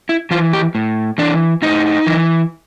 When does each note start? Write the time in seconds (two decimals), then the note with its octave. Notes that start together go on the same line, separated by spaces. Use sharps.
0.09 E4
0.31 E3 F4
0.53 G4
0.75 A2
1.18 E3 D4
1.62 A2 D#4
2.06 E3